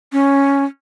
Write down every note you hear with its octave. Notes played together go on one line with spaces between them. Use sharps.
C#4